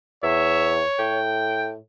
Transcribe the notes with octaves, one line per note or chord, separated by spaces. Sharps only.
E2 C#5 E5
A2 G5